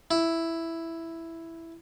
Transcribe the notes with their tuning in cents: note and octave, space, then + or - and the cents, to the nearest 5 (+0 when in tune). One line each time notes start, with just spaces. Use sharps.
E4 +0